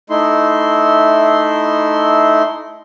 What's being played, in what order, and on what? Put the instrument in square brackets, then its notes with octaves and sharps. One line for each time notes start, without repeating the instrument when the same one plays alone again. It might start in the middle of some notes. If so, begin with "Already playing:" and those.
[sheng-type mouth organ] A3 D#4 E4 C6